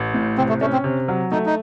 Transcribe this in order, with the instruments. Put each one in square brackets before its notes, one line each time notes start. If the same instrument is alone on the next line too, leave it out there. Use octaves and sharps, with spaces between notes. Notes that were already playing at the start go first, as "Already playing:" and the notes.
Already playing: [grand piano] A1
A2
[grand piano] C3 [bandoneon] C4
[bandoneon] A3
[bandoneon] A3 [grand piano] C#4
[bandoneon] C4
[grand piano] C3
F#3
[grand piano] A3 [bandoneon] D#4
[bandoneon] D#4